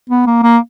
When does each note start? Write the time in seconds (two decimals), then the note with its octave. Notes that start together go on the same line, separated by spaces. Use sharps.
0.10 B3
0.27 A#3
0.43 A#3